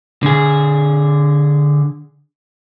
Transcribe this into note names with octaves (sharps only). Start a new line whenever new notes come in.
D3 G#4